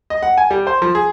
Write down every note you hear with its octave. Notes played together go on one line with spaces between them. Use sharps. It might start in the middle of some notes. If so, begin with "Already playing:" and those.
D#5
F#5
G#5
G3
C5
F3
G#4